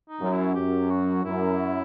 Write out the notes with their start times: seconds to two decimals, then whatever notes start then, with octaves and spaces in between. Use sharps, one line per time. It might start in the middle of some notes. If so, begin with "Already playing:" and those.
0.09 D#4
0.21 F#2
0.32 E4
0.55 F#2 G4
0.90 F#4
1.24 F#2 E4